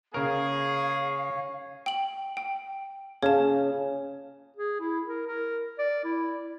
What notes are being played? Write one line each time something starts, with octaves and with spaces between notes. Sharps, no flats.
C#3 A#3 G#4 A#4 C#5 F5
G5 F#7
G5
C#3 C#5 A5
G#4
E4
A#4
A#4
D5
E4